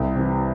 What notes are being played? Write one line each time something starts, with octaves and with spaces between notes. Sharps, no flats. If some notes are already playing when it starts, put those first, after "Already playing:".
Already playing: C2
C3 E3